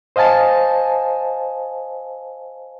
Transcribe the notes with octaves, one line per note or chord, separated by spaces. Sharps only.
C5 D#5 F5 G#5 A5